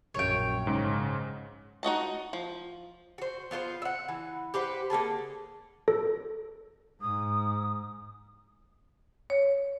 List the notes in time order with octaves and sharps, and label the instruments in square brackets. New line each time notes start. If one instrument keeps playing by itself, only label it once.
[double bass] A#1 F#2 [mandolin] C#5 G5
[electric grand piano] G#2 C#3
[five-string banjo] D#4 F#4 D#5 A5
F3
[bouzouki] F#4 C5
B3 F4 A4 C5
E5 F#5
E3
G4 B4 C5 F#5
A#3 C#4 G#4 A4
[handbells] A4
[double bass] G#2 [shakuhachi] D#6
[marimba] C#5